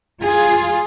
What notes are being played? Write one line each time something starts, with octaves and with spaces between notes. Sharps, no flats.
F4 G#4